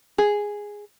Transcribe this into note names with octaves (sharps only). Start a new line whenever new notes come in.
G#4